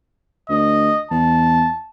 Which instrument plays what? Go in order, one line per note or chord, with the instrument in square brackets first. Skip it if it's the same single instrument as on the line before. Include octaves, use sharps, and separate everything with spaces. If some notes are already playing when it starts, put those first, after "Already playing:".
[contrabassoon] D2 [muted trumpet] D#5
[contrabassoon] E2 [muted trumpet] A5